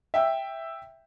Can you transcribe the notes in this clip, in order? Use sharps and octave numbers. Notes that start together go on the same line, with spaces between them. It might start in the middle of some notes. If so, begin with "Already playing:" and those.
E5 G5 E6